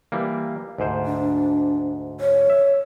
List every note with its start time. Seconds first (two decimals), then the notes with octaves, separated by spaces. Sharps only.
0.12 E3 G3 A#3
0.78 D2 G#2 C5
1.06 D4
2.20 C#5
2.50 E5